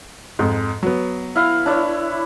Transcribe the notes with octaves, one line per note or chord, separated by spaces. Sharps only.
F2 G#2
F#3 B3
E4 F5
D4 E4 C#5